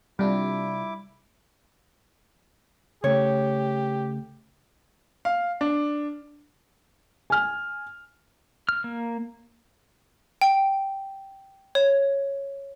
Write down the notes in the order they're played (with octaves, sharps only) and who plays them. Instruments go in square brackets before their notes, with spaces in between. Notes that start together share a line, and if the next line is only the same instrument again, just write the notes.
[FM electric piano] C3 D4 F4 [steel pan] G3 [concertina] E4 D6
[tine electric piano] C#3 A3 [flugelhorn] G4 [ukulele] C#5
[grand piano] F5
D4
[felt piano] G#5 F6
[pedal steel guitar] F6
A#3
[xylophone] G5
C#5